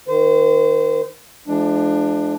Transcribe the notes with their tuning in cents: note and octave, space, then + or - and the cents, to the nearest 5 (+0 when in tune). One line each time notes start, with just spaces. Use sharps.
D#3 +0 C5 -30
F3 -30 G#3 +45 D4 +15